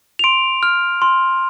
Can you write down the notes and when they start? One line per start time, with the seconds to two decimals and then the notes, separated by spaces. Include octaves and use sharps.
0.19 F7
0.24 C6 D7
0.63 F6
1.02 C6